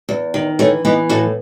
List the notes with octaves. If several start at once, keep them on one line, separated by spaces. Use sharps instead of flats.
E2
D#3
E3 A3 C#4
E3 B3 D#4
A2 F#4 A4